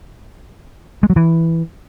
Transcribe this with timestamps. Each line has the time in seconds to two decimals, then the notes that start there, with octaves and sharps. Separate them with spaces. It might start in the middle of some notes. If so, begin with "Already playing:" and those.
1.03 G#3
1.10 F#3
1.16 E3